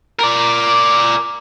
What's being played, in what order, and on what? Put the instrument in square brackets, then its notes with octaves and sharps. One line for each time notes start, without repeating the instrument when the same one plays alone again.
[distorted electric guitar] A#4 D5